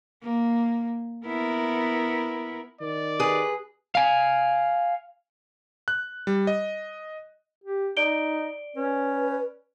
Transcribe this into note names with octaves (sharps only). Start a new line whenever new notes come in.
A#3
B3 E4 A#4
D#3 D5
G#4 B4
F5 G#5
F#6
G3
D#5
G4
D#4 D5 D7 G7
C#4 B4